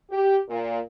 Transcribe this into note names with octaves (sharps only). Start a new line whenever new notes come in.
G4
A#2